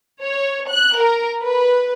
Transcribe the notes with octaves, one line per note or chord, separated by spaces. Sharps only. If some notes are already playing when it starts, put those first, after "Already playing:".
C#5
F#6
A#4
B4